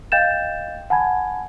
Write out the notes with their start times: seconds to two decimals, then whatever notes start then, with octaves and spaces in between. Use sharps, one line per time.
0.12 D#5 F5 G5 G6 A6 E7
0.90 F#5 G#5 A5 B5 G#6